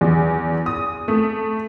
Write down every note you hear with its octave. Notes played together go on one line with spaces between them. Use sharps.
E2
D#6
A3